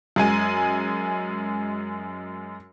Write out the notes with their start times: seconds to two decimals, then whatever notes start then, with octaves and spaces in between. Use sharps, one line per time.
0.16 F#2 G#3 G#5